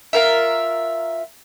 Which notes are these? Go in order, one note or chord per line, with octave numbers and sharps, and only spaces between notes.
F4 A#4 E5